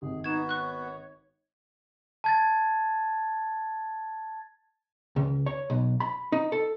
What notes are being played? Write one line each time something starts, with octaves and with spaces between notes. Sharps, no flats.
G#1 G#4
B3 D#4 F#4 G#6 E7
C#5 C#6 F#6
A5 G#6 A6
C#2
C#5
B1
B5
D#4
A4